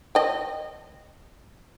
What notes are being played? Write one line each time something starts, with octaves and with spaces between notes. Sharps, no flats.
D#5 G5